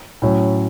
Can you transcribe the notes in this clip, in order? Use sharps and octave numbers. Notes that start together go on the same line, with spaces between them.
A2 F#3 C#4